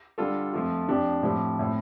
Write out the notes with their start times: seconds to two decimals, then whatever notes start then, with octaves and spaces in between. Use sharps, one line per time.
0.18 D3 G3 F4 A4
0.53 F2 F3 A3 F4 A4
0.88 F2 F3 D4 G4
1.23 A2 F3 C4 G4
1.59 A2 A3 C4